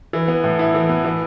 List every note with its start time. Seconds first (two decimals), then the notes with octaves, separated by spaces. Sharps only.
0.13 E3
0.28 B3
0.44 A2
0.59 E4
0.74 E3
0.89 B3
1.05 E3